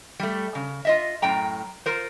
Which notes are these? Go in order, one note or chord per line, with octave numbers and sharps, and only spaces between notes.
G3 A3
C#3
F4 D#5 E5
F#2 A2 G5 A#5
F4 A#4 C5